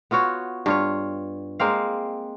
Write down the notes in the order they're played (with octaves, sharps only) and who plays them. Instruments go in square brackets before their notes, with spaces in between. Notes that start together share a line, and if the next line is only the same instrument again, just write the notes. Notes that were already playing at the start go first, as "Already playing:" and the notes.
[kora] B3 F4 F#4 C#5
G2 F4 C#5
G#3 A#3 C4 F5